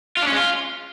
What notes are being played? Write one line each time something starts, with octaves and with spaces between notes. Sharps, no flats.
F4
D4
C#4
G#3
F4